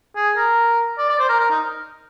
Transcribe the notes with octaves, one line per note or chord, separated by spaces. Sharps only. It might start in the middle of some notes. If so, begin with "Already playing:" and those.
G#4
A#4
D5
D5
C5
A#4
A#4
D#4